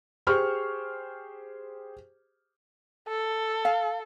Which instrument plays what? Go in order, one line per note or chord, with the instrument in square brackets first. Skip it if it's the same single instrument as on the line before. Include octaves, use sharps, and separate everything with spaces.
[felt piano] G4 G#4 C5 C#6 F6
[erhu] A4
[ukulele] F5